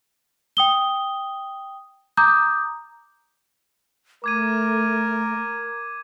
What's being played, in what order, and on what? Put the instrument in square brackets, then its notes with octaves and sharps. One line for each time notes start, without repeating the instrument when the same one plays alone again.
[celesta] G5 D#6 G7
A#5 D6 D#6 G6
[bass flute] A3 [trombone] A#4 [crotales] D6 G#6 D#7